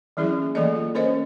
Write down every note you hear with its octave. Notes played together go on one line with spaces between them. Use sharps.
E3 F#3 C#4 E4 G#4
A#3
E3 A3 A#3 A4 D5 D#5
F4
A#3 C#4 A#4 C5 C#5 D#5